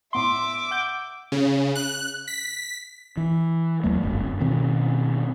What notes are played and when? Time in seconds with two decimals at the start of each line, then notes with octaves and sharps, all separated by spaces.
0.13 A2 B3 E5 C6 D6
0.71 F#5 G6
1.32 C#3
1.75 F#6
2.28 B6
3.17 E3
3.84 D#2 F#3 A3
4.02 D1 G1 F#2
4.40 B2 D#3 C4 C#4